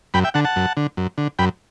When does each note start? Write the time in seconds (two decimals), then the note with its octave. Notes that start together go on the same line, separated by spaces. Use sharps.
0.14 F#2 G5 B5
0.24 E5 G5
0.34 D3 F#5 A5
0.45 F#5 A5
0.56 F#2
0.77 D3
0.97 F#2
1.18 D3
1.39 F#2 G5 B5